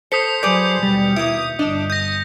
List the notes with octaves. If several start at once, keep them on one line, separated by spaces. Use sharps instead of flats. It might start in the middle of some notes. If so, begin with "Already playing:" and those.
A4 C5 D#6 B6 C#7
F#3 G#4 B4 D5 G6
D#2 B2 G3
A#3 E4 D#6
G1 D4 D#5
D#6 G6 A#6